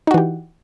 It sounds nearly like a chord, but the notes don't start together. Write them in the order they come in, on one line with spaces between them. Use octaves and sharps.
D#4 F#4 E3 G4